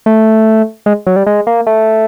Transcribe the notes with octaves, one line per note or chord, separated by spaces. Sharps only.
A3
G#3
F#3
G3
G#3
A#3
A3